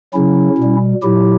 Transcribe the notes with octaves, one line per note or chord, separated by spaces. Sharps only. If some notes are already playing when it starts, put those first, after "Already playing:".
C#3 F#3 C#4 E4
B2 G3
A#2 F#3 E4 G4